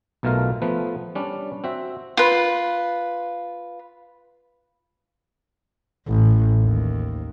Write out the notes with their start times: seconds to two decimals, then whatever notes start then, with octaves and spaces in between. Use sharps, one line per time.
0.23 B1 B2 A3 F4 A#4 F5
0.62 F3 A3 B3 B4
1.15 G3 C#4 D4
1.64 C4 F#4 E5
2.17 F4 B4
6.07 A1
6.63 D#2